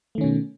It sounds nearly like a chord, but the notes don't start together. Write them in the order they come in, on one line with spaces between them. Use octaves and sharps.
A3 D#3 C#4 B2